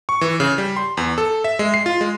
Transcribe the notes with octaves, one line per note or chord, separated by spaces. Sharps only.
C#6
E3
C#3
G3
C6
E2
A4
E5
G#3
C7
F4
G#3